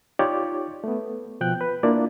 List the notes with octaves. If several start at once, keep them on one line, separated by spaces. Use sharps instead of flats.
D#4 F4 G4 C#5 D5 D6
A3 B3
B2 F3 G5 F#6
B4
A#3 D4 E4 F4 D5